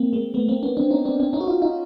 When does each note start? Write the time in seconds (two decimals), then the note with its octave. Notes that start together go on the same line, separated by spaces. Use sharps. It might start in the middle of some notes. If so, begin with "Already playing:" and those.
Already playing: A#3 C4
0.13 G#3 A#3
0.34 A3 B3
0.48 A#3 C4
0.63 B3 C#4
0.77 C4 D4
0.91 C#4 D#4
1.05 C4 D4
1.20 C4 D4
1.33 C#4 D#4
1.40 F#4
1.47 D#4 F4
1.62 D#4 F4